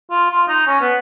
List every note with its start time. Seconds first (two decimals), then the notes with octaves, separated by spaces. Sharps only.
0.11 F4
0.30 F4
0.48 D#4
0.67 C#4
0.81 B3